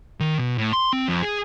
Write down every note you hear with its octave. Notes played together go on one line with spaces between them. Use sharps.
D#3
B2
A2
C6
C4
F2
G#4